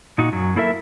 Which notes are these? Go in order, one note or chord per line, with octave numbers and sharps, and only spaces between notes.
A#2 D#4 F#4
F#2 F#3
A#3 E4 A4 A#4 E5